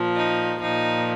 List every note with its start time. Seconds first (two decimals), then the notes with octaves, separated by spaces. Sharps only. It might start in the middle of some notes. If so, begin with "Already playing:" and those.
Already playing: A#2 F3
0.15 D#4
0.60 A#2 F3 D#4